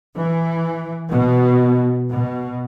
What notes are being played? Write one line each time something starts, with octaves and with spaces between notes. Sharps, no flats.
E3
B2
B2